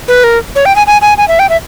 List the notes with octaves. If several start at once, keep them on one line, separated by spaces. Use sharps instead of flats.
B4
A#4
C#5
G5
G#5
G#5
G#5
G#5
E5
G5
E5